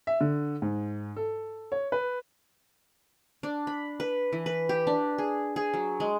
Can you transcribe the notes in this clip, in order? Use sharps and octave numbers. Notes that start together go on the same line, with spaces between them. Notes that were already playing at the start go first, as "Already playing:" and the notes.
E5
D3
G#2
A4
C#5
B4
D4
B5
B4
E3
B4
G4
D4
G#4
G#4
F#3
G#3